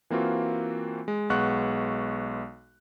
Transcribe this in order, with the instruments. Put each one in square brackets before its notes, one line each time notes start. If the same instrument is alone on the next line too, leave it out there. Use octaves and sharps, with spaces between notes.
[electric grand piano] E3 A#3 C4 F4 F#4
G#3
B1 G#3 B3 F#5 C#6 F#6